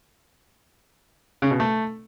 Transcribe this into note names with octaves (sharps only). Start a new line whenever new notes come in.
C#3
B2
A3